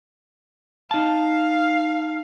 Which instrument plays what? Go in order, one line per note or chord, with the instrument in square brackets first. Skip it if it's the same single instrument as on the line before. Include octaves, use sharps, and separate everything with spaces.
[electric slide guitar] D#4 A5 [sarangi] F5